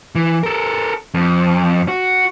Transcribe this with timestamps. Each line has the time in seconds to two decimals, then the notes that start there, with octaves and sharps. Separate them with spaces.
0.15 E3
0.44 A4 A#4
1.14 F2
1.88 F#4